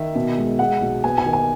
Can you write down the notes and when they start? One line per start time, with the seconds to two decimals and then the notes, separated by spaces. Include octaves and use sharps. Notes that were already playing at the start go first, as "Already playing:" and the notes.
Already playing: D#3 E5
0.15 B2
0.37 G#3
0.59 G#3 F#5
0.81 B1
1.04 B3 G#5
1.18 G#5
1.26 D#3
1.33 G#5